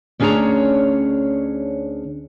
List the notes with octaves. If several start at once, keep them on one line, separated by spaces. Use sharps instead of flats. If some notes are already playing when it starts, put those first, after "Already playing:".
D2 C#4 D4 G#4 C#5 A#5